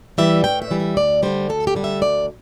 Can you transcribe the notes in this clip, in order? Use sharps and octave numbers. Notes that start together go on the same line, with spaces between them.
E3 G3 E5
A2 G5
E5
E3 G3
E5
D2 D5
D3 G3 C5
D2 A4
G4
D3 G3
E5
D2 D5